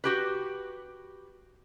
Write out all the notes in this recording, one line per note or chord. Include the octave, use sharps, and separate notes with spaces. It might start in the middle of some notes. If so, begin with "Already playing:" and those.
F#4 G4 B4